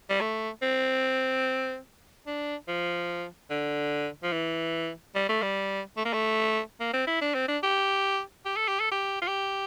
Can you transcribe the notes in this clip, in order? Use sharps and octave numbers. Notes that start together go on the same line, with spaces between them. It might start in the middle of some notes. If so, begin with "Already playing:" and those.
G3
A3
C4
D4
F3
D3
F3
E3
G3
A3
G3
A3
A#3
A3
A#3
C4
E4
D4
C4
D4
G4
G4
A4
G4
A4
G4
F4
G4